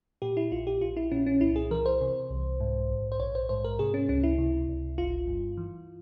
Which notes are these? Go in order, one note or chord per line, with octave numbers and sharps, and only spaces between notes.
A#2 G4
E4
A#1 F4
G4
A#1 F4
E4
A#2 C#4
C#4
C2 E4
G#4
E3 A#4
C5
C3
C2
G#2
A#1
C5
A#1 C#5
C5
G#2 C5
A#4
C3 G#4
C#4
C#2 C#4
E4
C3
C#2
G1 F4
G2
E3